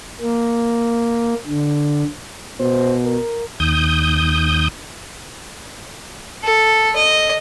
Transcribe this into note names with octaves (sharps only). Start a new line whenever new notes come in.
A#3
D3
B2 C5
A#4
D#2 D#6 G6
A4
D#5